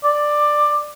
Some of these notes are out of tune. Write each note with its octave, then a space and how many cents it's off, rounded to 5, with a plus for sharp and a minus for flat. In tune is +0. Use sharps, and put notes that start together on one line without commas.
D5 +10